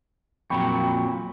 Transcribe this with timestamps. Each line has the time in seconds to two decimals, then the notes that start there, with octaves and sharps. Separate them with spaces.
0.50 F2 A#2 F#3 G5 B5 C#6